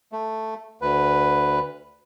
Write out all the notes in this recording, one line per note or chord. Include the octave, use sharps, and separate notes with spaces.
A3
D2 B4